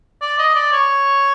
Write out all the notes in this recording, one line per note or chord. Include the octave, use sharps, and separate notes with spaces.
D5
D#5
D5
C#5